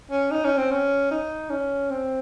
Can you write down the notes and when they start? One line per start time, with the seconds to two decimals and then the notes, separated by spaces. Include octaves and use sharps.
0.11 C#4
0.31 D#4
0.45 C#4
0.58 C4
0.71 C#4
1.11 D#4
1.50 C#4
1.91 C4